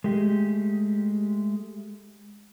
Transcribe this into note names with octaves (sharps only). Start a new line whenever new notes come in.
G#3 A3 G4